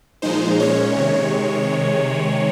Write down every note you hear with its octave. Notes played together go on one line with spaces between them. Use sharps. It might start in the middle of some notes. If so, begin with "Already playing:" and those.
A#2 F3 G#3 D#4 C5
A#2 G#3 C#4 C#5
C3 D#3 G#3